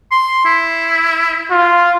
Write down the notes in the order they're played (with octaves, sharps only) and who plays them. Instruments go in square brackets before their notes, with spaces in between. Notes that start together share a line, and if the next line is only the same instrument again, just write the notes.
[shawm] C6
E4
[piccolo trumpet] F4